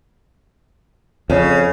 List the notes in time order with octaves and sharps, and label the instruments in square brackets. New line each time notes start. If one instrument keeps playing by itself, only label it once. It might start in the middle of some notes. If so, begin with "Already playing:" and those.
[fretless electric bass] F2 [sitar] C#3